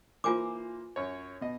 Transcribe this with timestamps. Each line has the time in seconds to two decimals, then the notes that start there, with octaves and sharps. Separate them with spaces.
0.24 E3 A#3 F4 C5 G#5 D6
0.96 F#2 C#5
1.41 B2 D#5